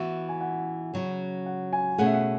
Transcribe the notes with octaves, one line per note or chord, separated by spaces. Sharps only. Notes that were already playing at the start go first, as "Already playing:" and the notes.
Already playing: E3 B3 F#4 E5
G#5
F#5
C#3 F#3 C#4 F#4
F#5
G#5
B2 A3 C#4 G#4 F#5
E5
F#5